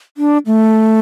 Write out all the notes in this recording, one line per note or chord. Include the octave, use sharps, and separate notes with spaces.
D4
A3